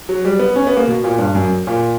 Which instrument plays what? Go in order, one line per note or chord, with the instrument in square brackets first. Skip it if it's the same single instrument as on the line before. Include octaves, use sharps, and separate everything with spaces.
[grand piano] F#3
G3
B3
C#4
B3
A#3
B2
A#2
G2
F#2
A#2